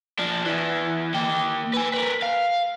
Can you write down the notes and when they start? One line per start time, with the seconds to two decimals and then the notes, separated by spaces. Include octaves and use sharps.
0.19 F3 D4
0.45 E2 E3
1.15 A#3 G5
1.74 B4 G#5
1.94 A#4 B4
2.22 F5